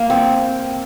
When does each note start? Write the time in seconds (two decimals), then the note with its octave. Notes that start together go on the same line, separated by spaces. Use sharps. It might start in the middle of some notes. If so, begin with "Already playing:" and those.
Already playing: A#3
0.10 C4